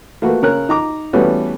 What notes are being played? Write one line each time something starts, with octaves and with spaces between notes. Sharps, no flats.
A3 A#3 F#4 B4
C#3 A#4 C#5 F#6
D#4 A#5 D6
E3 G3 A3 B3 C#4 F#4